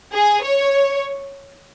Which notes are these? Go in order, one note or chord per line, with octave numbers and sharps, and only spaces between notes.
G#4
C#5